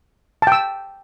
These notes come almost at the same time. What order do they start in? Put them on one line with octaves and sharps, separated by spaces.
A5 G5 E6